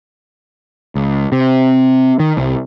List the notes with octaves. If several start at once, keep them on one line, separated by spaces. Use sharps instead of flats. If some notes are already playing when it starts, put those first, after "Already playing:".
C#2
C3
D#3
C2